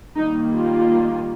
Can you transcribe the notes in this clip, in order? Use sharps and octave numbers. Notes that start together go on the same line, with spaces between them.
D#3 G3 A#3 D#4
F4